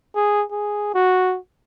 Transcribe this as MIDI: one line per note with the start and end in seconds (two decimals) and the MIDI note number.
0.15 0.44 68
0.51 0.93 68
0.94 1.38 66